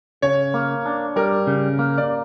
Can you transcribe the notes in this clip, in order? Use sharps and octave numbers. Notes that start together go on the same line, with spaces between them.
C#3 C#5
A#3
D4
G3 A#4
C#3
A#3
D5